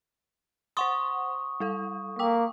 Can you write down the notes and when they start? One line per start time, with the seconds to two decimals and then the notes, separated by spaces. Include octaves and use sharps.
0.77 C5 F#5 C6 C#6 D#6
1.60 G3 A4 F5
2.19 A#3 G5 D6